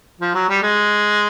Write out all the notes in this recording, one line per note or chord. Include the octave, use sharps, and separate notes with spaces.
F3
F#3
G3
G#3